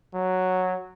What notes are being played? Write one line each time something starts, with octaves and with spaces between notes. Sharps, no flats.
F#3